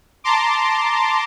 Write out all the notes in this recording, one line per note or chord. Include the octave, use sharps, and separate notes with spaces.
A5 A#5 C6 D6